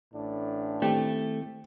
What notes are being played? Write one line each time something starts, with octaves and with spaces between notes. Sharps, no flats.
A1 A2 D4
D#3 A3 C4 E4 G4